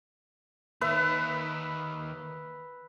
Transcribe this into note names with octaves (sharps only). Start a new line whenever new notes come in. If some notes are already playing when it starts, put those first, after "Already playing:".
D#2 D#3 B4 E5